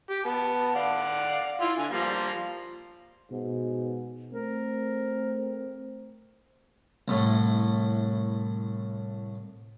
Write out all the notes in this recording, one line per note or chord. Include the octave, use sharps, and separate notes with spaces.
G4
B3 A5
D5 F5 F#5
E4 F4
D3 G#5
F3 G3 A#3
G#2 B2
A3 C4 A#4
C2 A2